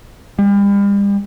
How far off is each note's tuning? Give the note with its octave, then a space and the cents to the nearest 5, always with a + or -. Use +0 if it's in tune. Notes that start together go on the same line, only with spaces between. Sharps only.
G3 +40